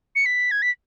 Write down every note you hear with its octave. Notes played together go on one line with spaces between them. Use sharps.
C#7
B6
G#6
B6